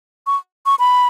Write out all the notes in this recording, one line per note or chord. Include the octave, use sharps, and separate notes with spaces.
C#6
C#6
B5